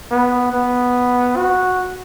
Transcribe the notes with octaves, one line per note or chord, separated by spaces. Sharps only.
B3
B3
F#4